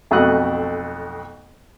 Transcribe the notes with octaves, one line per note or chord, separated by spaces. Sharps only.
B1 F2 A3 F#4 D#6 F#6